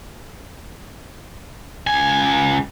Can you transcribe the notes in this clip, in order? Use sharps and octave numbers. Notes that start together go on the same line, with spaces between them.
C#2 G#5